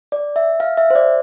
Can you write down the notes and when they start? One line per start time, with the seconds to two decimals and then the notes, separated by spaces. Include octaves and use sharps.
0.12 D5
0.36 E5
0.60 F5
0.77 E5
0.90 C5
0.95 D5